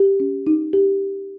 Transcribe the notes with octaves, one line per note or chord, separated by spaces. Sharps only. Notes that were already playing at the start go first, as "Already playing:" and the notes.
Already playing: G4
C#4
D#4
G4